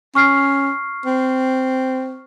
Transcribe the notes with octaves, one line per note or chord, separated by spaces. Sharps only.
C#4 C#6 F6 C7
C4